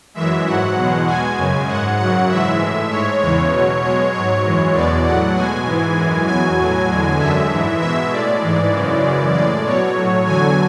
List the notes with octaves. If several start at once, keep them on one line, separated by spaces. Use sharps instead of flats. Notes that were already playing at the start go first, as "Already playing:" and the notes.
F#2 E3 G#3 E5
G#2 F#3 F#5
E2 B2 G#3
B2 G#3 G#5
F#2 C#3 G#3
G#2 G#3 F#5
F#2 C#3 F#3 F#5
G#2 E3 G#3 E5
A2 G#3
G#2 G#3 C#5
E2 C#3 E3 G#3 C#5
B2 F#3
B2 G#3 C#5
G#2 F#3 C#5
F#2 E3 G#3
E2 B2 G#3 D5
A2 F#3 F#5
B2 G#3 G#5
G#2 E3 G#3
F#2 E3 G#3
E2 B2 F#3 G#5
A2 F#3
E2 D3 G#3
F#2 D3 G#3 E5
G#2 E3 G#3
B2 G#3 E5
A2 G#3 D5
G#2 E3 G#3
F#2 C#3 E3 G#3
F#2 C#3 E3 G#3
A2 G#3 D5
B2 F#3 C#5
A2 F#3
E2 D3 F#3 G#5